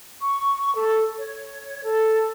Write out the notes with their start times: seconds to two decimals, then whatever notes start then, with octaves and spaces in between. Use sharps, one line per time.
0.20 C#6
0.75 A4
1.18 C#5
1.83 A4